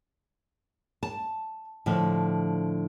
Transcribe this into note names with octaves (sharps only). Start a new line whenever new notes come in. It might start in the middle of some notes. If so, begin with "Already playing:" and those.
A5
A2 D3 F3